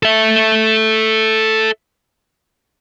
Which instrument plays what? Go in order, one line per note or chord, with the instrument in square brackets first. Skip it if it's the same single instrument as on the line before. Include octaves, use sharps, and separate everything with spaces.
[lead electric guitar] A4 E5